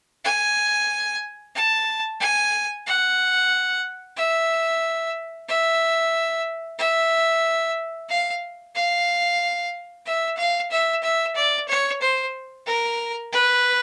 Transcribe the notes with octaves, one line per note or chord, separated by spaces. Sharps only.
G#5
A5
G#5
F#5
E5
E5
E5
F5
F5
E5
F5
E5
E5
D5
C#5
C5
A#4
B4